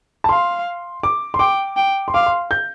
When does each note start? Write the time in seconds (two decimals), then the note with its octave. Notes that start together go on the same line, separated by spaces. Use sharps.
0.24 A5
0.29 F5 C6
1.03 D6
1.34 C6
1.39 G5 D6
1.76 G5
2.08 C6
2.14 F5 D6
2.26 C6
2.51 G6